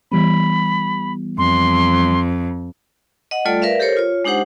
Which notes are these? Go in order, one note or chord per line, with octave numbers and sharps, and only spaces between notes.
E3 G3 B3 B5
F2 C6
D#5 F#5
G3 A3 F4 A4 D5
A#4 B4 D5 E5 F5
G4 A4 A#4 C5 C#5
F4 C#5
G#3 D4 D#4 G4 C5 F#5